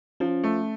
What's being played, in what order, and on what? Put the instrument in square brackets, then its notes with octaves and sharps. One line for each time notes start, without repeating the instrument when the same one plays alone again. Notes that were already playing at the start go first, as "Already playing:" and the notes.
[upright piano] F3 [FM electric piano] C#4
[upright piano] A3